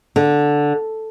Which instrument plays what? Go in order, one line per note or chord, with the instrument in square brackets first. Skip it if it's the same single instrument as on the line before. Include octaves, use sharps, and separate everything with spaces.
[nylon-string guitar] D3